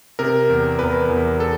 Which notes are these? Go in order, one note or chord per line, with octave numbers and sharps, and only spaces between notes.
C3 A#4
E2
E2 B4
E2
A4